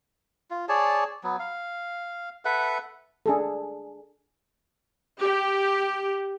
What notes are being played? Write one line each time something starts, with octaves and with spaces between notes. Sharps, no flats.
F4
G#4 C#5 D5 A5
F#3 B3
F5
A4 B4 E5 F#5
D4 G#4 A4
G4